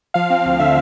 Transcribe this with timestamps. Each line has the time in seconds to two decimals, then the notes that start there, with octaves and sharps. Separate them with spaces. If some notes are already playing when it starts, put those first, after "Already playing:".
0.14 F3 F5
0.30 C4
0.45 D2
0.59 D3 E5